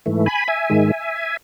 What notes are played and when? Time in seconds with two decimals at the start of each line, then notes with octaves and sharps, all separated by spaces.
0.06 G#2 E3 A3
0.26 G#5 B5
0.48 E5 G#5
0.70 G#2 D#3 G#3